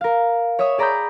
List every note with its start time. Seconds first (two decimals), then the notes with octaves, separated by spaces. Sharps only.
0.01 A#4 F5
0.59 C#5 E5 C#6 D#6 E6
0.78 G#4 D5 A#5 B5 D#6 G6